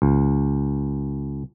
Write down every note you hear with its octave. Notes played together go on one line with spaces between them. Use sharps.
C#2